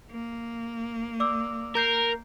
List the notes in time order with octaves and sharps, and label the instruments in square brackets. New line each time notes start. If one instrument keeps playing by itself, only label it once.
[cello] A#3
[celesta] D5 D6 E6
[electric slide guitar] A#4 [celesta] A#5 G6 C7